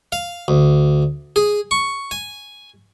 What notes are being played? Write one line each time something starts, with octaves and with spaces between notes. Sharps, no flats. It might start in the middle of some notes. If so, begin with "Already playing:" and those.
F5
D2
G#4
C#6
G#5